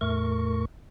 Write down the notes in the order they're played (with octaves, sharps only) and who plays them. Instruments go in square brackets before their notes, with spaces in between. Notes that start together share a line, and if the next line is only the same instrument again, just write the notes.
[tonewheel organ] E2 A2 A3 A#4 C#6